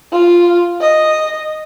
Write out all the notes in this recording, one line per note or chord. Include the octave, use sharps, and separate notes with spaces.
F4
D#5